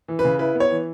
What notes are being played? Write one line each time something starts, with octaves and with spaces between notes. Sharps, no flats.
E3
B4
C#3
E4 B4
B3
C#5
E3